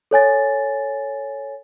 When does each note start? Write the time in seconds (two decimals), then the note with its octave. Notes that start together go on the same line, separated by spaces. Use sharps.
0.11 A4 C#5 G#5 A6